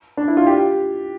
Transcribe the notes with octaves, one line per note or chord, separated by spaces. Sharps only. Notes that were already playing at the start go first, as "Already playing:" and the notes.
D4
E4
F4
G4